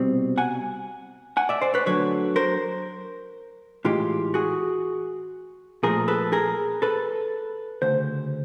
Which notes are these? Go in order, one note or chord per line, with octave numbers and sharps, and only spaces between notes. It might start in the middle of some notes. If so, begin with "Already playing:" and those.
Already playing: C2 B2 G3 C4
F#5 G#5
F#5 G#5
D5 E5
C5 D5
B4 C#5
D2 D3 F#3 B4 C#5
A#4 C5
A2 E3 G#3 F4 G4
F#4 G#4
A#2 F3 A3 G#4 A#4
A4 B4
G#4 A#4
A4 B4
D2 C#3 C5